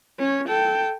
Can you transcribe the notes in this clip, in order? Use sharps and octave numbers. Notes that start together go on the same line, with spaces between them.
C#4 C#5
A4 G5